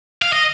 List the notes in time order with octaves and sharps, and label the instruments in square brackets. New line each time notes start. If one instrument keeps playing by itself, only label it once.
[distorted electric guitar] F5
D#5